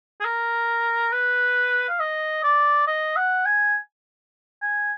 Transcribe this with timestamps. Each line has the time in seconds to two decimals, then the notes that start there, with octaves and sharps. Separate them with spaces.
0.20 G#4
0.25 A#4
1.12 B4
1.89 F5
2.00 D#5
2.44 D5
2.87 D#5
3.16 F#5
3.46 G#5
4.62 G#5